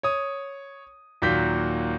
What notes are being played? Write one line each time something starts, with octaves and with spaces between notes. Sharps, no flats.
C#5 D#6
D#2 A#2 F#3 G6 B6